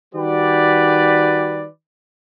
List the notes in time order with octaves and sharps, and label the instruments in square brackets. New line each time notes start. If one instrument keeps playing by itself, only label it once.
[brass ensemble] D#3 G3 F#4 G4 B4 D5